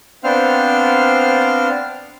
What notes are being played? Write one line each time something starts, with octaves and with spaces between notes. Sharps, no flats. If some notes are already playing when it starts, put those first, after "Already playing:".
B3 C4 D4 C5 F5 F6